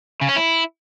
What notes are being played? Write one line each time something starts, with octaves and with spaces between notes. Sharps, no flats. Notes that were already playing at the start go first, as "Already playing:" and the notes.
C#3
C#4
E4